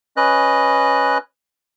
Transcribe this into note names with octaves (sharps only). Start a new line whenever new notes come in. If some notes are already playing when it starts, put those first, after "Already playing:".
C#4 B4 D#5 F#6